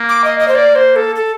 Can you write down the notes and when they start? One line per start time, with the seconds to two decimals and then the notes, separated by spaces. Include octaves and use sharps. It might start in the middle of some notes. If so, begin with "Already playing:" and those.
Already playing: A#3
0.09 D6
0.24 D#5
0.40 D#5
0.48 C5
0.55 D5
0.75 C5
0.96 A4
1.16 A4